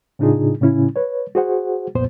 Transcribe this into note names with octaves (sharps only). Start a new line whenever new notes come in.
A2 C#3 D4 D#4 F4 G#4
A2 C#3 C#4 E4
B4 C#5
F#4 G#4 C5 F#5
C2 F2 A#2 B3 C5